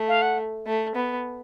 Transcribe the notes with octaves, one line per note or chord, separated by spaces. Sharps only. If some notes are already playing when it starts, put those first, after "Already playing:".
Already playing: A3
F5
F#5
A3
B3